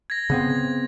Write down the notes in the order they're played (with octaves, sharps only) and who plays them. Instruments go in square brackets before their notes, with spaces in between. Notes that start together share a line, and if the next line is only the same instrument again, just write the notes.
[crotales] G#6 A#6
[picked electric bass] C#3 B3 C4
[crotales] G#6